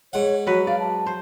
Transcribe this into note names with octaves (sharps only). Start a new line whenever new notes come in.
G#2 C#5 F#5
F#3 F#4 B4
D5 F5
A5
C5